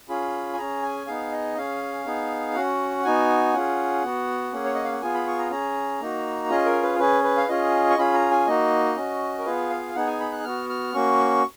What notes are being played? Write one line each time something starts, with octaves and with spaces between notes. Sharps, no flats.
C#4 F4 G#4 B5
G#5
C#4 G#4 A#5
G#5
B3 D#4 G#4 F5
D#5
C#4 G#4 F5
B3 D#4 G#4
C#4 F#4 F#5
B3 D#4 F#4 G#5
C#4 F4 G#4 F#5
B3 F#4
A#3 C#4 G#4
C#5
D#5
F5
F#5
B3 F4 G#4 G#5
B5
C#6
A#5
C#4 G#4 A#5
A#3 D#4 F#4
C#4 F4 G#4 D#5
A#4
B4
C#4 G#4 B4
B4
F5
C#4 F4 G#4 D#5
C#6
C#4 F4 G#4 B5
A#5
G#5
A#3 D#4 F#4 D#5
C#4 F#4
A#4
B3 F4 G#4 B4
F5
B3 D#4 G#4 F#5
G#5
B5
F#6
B3 F#4 F6
F6
A#3 C#4 F#4 C#6